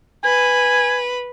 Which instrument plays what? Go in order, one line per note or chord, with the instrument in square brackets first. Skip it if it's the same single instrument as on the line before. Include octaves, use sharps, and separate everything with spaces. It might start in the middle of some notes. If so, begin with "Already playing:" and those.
[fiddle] B4 [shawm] G#5